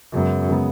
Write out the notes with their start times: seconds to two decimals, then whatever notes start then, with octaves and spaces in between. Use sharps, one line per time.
0.13 F#2 C#3 G#3 B3
0.49 C#3 G#3 B3